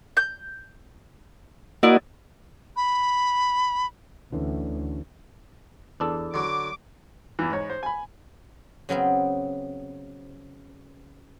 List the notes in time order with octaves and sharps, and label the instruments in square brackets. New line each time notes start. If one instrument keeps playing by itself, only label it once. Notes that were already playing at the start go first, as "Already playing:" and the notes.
[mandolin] G6
[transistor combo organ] A#3 F#4 D#5 [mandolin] E4 D5
[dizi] B5
[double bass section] D2 [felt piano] D3 E3 C#4
[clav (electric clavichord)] E2 D4 A4
[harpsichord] D3 F#3 [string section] D6
[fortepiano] E2 E3
G#2 C#5
C5
G#5 B5
[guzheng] C#3 F#3 B3 C4